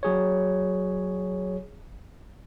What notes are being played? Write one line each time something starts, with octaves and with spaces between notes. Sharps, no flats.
F#3 G#4 C#5